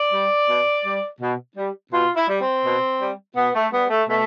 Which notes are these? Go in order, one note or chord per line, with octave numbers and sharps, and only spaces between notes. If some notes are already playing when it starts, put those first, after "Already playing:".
Already playing: D5
G3
B2
G3
B2
G3
B2 F4
E4
G3
C4
B2
G3
B2 B3
A3
G3 B3
A3
B2 A3